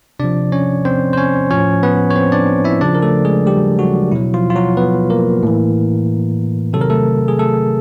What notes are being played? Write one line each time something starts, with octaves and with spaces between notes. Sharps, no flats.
C3 F3 D4 D5
C#4 C#5
C4 C5
C5
C#4 C#5
A2 F3 C#4 C#5
B3 B4
C#5
C4 C5
D4 D5
E4 E5
C#3 F3 D4 D5
A#4
A3 A4
G#3 G#4
G3 G4
F#3 F#4
B2 F#3 E4
F3 F4
F4
F#3 F#4
B3 B4
A#3 A#4
A2 E3
C3 D#3 F#3 A4
A#4
A3 A4
G#4
A3 A4